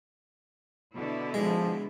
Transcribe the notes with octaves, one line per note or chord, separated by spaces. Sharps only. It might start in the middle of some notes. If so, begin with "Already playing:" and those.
B2 D3 E4
F3 G#3